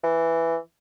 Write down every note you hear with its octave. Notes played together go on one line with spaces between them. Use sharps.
E3